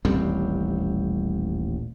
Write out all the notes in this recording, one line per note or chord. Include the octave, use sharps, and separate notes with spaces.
D#1 A1 G3 C4